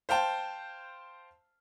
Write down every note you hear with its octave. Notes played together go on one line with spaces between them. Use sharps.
C5 F5 G5 A5